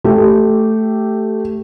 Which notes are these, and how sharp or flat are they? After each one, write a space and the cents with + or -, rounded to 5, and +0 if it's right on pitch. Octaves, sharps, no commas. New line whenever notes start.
A3 +0 G4 -10